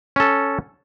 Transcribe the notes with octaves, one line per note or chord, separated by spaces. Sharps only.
C#4 A4